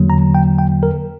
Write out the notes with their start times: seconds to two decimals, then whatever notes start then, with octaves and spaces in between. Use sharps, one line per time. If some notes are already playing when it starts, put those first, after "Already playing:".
Already playing: E2 D3 F#3 A#3
0.10 A#5
0.35 G5
0.59 G5
0.83 A#4